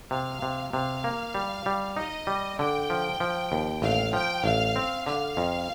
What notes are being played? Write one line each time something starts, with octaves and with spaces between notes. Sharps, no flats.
C3 F5
C3
C3 F5
A#3
G3
G3
D#4 D#5
G3
D3 G5
F3
F3
D#2
A1 F5
F3 G5
A1 F5
C4
D3 F5
F2